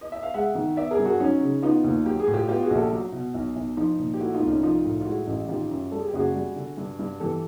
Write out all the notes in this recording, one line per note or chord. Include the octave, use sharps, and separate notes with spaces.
D#5
E5
F5
G#3 E5 F#5
D#3
B3 D5 E5
G#4 A#4
G2
F#4 G#4
F#3 C#4 D#4
C#3
B3 D#4 F4
D#2
F#3 G4
G#4
A2
F4 G4
B3 F4 G4
F#4 G#4
A#1
G4 A4
F#3
B2
B1
B1
F3 D#4 F4
A#2
G4
A3 E4 F#4
D#4 F4
C2
C#4 D#4
F3 D#4 F4
A2
F4
G#3 E4 F#4
A1
D#3 F4 G4
F#2
G3 A4
G#4
G4
F#1 F#4 G#4
G3
D3
G2
G2
E3 G4 A4